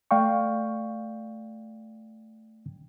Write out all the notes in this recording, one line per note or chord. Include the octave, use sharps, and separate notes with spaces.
A3 D5 F5 G5 C#6